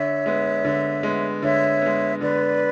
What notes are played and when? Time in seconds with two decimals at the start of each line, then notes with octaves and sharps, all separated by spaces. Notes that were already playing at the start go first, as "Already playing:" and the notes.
Already playing: D3 C#5 E5
0.26 G#3 B3
0.65 D3
1.03 G#3 B3
1.42 D3 C#5 E5
1.82 G#3 B3
2.21 D3 B4 D5